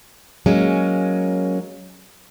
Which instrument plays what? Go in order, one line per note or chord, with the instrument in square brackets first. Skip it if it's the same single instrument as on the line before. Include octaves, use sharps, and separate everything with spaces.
[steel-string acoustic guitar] F#3 G#3 A#3 C#4